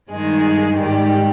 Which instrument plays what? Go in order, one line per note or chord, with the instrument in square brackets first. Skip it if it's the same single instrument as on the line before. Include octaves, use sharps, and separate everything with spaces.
[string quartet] G2 D#3 G#3 G#4
G#2 D#3 G3 G4